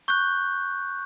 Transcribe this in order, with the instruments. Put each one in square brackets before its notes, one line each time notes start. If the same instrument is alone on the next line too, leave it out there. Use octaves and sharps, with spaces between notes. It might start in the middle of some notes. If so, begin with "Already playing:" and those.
[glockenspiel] C#6 F#6 G6